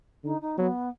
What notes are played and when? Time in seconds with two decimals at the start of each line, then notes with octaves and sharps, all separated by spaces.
0.24 D3 D#4
0.41 D#4
0.58 F#3 B3